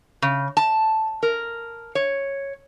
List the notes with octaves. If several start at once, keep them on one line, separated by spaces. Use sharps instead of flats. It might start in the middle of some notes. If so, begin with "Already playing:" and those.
C#3
A5
A#4
C#5